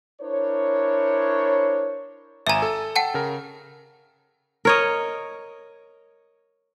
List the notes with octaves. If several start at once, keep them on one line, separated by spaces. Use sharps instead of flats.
D4 E4 A#4 C5 C#5
G#1 E5 G#5 A#5 E7
A4
F#5 G5 A5
C#3 A#4
A#4 C#5 D#5